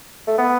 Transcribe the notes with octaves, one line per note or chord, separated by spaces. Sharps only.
A3
B3